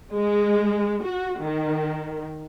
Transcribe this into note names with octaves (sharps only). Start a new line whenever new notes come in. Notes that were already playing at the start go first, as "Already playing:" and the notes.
G#3
F#4
D#3